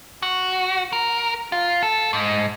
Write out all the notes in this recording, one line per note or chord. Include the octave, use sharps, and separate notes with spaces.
F#4
A#4
F4
A4
G#2